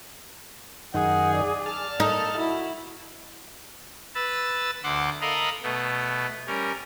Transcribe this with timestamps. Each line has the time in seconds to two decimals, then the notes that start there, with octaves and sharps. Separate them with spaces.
0.94 F#2 D#3 D#4 G#4 F#5
1.34 D5
1.66 A5 F6
2.00 A#3 D#4 A4
2.38 E4 F#4
4.15 B4 E6 A6
4.83 D2 F#5 C6 D6
5.21 A4 A#4 D#5 F5 B5
5.63 B2 A3 B3
6.47 G3 C#4 A#4